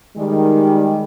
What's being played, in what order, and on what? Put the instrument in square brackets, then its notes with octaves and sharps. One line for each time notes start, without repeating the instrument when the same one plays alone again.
[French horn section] D#3 G3 G#3